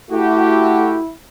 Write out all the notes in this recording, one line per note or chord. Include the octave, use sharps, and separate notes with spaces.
A3 E4 F#4 G4